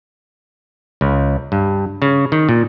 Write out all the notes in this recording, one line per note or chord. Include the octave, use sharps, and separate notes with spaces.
C#2
G2
C#3
D#3
A#2